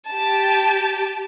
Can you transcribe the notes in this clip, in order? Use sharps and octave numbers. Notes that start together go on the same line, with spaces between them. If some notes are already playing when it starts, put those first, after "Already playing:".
G4 A5